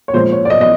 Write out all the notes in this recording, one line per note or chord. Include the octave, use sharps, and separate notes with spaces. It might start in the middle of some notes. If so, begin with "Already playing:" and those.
C#5
A#2 F3 G#3 C5
C#5
D5
D#5
D#5